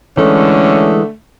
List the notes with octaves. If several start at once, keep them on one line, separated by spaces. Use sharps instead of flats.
D3 E3 G#3 A3 C#4